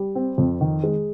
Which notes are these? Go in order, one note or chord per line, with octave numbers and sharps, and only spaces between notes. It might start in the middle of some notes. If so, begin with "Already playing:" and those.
Already playing: G3
C4
F2
D#3
G#3